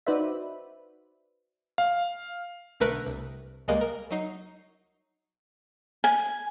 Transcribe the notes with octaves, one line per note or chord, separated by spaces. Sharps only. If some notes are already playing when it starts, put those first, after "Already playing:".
D#4 F#4 B4 C5 D5 E5
F5
B1 D3 A3 A#4 B4 F#6
C2
C#2 G3 G#3 A#3 D#5 F#6
A#4
F#3 D#4 C7
G#5